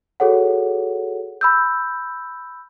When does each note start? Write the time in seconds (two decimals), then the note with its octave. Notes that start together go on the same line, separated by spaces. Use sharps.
0.20 F#4 G#4 A4 C#5 F#5
1.41 B5 E6 G6